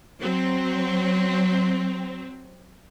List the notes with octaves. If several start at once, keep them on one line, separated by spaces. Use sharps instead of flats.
F#3 C4